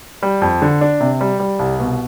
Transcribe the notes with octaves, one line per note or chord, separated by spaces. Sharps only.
G3
F2
D3
D4
C3
G3
G3
C2
B2